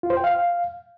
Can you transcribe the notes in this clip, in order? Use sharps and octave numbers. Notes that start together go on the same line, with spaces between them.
F4
C5
G5
F5